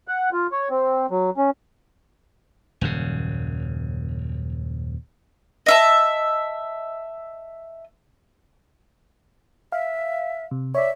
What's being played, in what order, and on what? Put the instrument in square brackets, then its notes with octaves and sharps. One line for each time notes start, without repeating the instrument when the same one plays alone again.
[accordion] F#5
F4
C#5
C4
F#3
C#4
[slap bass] D#1 F#2 C#3
[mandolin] D#5 E5 A5
[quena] E5 [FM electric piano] F5
[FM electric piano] C3
[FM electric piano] C#5 D5 [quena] E5